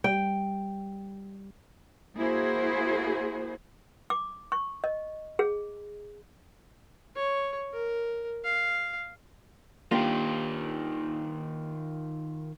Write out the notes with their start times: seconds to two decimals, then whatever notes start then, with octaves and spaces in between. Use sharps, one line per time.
0.04 G3 G5
2.18 A#3 E4 F#4 G#4 C5
4.10 D6
4.52 C#6
4.84 D#5
5.39 G#4
7.16 C#5
7.74 A#4
8.45 F5
9.91 D#3 A#3 D4 F4 G4